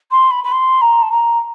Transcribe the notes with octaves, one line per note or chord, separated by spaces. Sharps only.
C6
B5
B5
C6
A#5
A5
A#5